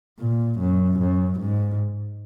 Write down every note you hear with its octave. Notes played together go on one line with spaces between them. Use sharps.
A#2
F#2
F#2
G#2